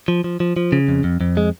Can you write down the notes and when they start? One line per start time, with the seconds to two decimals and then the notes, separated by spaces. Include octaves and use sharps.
0.08 F3
0.24 F3
0.40 F3
0.57 F3
0.72 C#3
0.88 F2
1.04 F2
1.21 F2
1.37 G#3